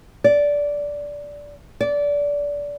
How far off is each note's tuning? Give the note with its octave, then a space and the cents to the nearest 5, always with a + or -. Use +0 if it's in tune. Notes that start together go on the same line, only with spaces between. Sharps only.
D5 -10
D5 -20